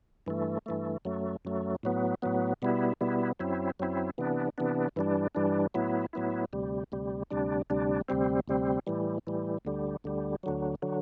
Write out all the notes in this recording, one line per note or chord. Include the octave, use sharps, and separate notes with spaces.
G2 E3 A3
G2 E3 A3
F#2 F#3 A3
F#2 F#3 A3
A2 F#3 B3
A2 F#3 B3
B2 G3 B3 E4
B2 G3 B3 E4
F#2 F#3 C4 E4
F#2 F#3 C4 E4
C3 E3 B3 D4
C3 E3 B3 D4
G2 E3 G3 D4
G2 E3 G3 D4
A2 F#3 B3 E4
A2 F#3 B3 E4
D2 C3 G3
D2 C3 G3
D2 C3 G3 D4
D2 C3 G3 D4
D2 C3 G3 C4
D2 C3 G3 C4
A2 E3 G3
A2 E3 G3
D2 D3 G3
D2 D3 G3
D2 D3 F#3
D3 F#3